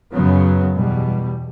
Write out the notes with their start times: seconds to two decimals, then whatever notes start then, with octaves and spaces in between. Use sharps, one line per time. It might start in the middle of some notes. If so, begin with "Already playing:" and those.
0.13 F#2 C#3 F#3 B3
0.75 E2 B2 G3